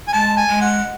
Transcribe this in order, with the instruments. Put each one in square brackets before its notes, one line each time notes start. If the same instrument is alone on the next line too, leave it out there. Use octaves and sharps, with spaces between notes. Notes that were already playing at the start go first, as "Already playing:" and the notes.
[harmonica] G#5
[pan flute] G#3 [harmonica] A5
[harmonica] G#5
[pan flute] G#3
[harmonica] F#5